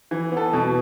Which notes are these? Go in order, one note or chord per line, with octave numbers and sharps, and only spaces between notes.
E3
B3 A4
B2